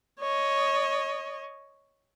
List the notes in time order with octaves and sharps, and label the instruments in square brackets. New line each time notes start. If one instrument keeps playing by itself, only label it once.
[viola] C#5 D#5